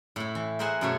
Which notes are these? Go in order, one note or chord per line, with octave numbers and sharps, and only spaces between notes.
A2 E4
E3
G#4 A#4 C5 E5 F#5 G#5
F#2 B2 A3 G#4 C#5 E5